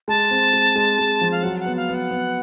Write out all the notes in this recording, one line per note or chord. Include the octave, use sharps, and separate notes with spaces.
G#3 A5
C4
G#3
G#3
G#3
F3
F5
F#3 F#5
F#5
B3
F5
B3
F#5
B3